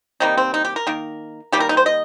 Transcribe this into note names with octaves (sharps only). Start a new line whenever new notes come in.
C3 D#3 G3 A#3 D#4
C4
D#4
G4
A#4
D#3 A#3
D#3 G3 A#3 G4
A#4
D#4
C5
D#5